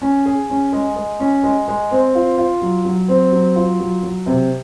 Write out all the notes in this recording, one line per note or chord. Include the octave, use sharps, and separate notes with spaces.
C#4
G#4
C#4
G#3
G#3
C#4
G#3
G#3
C4
F4
F4
F#3
F#3
C4
F#3
F4
F#3
F#3
C3